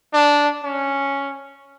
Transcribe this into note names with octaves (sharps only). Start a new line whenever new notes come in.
D4
C#4